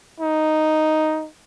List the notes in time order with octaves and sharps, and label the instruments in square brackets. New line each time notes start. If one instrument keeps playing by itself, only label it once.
[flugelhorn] D#4